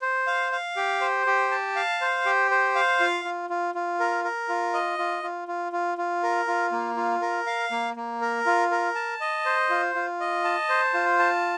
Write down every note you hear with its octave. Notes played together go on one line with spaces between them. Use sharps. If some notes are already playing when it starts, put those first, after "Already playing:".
C5
F5
F5
G4
C5
G4
A5
F5
C5
G4
C5
F5
F4
F4
F4
F4
A#4
A#4
F4
D#5
F4
F4
F4
F4
F4
A#4
F4
A#3
F4
A#4
F5
A#3
A#3
A#4
F4
A#4
A5
D#5
C5
F4
F4
D#5
A5
C5
F4
A5